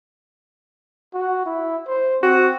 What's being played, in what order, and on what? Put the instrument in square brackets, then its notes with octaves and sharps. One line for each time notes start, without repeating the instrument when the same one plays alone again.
[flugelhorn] F#4
E4
C5
[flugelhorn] C4 [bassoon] F#4